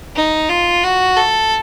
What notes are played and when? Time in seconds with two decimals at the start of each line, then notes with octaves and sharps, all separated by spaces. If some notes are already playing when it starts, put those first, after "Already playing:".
0.16 D#4
0.50 F4
0.84 F#4
1.16 A4